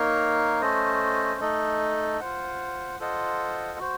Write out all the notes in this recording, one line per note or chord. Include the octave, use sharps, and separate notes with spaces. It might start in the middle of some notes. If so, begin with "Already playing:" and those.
Already playing: A#3 D#4 A#4 C#5 F5
A3 C#4 A4 C5 D#5
A3 D#4 A4 D#5
F4 C5 F#5
F4 A4 C5 D#5 F#5
F#4 C5